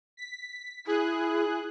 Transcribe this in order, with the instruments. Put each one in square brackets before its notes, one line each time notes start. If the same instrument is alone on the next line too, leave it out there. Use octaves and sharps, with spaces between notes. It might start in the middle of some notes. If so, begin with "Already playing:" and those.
[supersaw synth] B6
[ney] E4 [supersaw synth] G#4 F#6